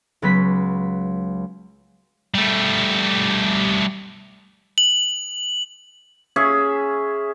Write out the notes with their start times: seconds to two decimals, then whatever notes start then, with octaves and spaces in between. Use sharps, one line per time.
0.22 C#2 F#3 B3 C#4 B5 B6
2.35 G3 A3
4.78 F#7
6.36 C#4 G#4 E5